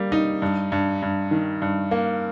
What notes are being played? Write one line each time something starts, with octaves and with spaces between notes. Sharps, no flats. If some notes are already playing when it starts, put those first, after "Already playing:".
Already playing: G3 A#3
D#4
G2
G2
G2
D#3
G2
A#3